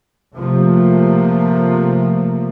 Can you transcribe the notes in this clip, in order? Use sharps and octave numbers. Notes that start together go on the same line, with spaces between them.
C3 F3 A3 A#3